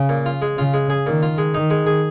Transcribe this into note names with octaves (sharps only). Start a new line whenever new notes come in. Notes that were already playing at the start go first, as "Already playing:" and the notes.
Already playing: C#3
A#2
F4
G#3
C#3 F4
G#3
G#4
A#2 D#3
F4
G#3
D#3 D#4
G#3
G#4